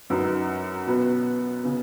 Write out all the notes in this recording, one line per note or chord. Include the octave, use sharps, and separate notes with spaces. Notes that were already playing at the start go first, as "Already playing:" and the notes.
F#2 F#3 D#4 B4
B2 B3 F#4 B4
C#3 B3